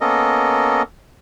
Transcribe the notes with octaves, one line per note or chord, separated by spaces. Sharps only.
A#3 B3 C#4 A4 A#4 D#5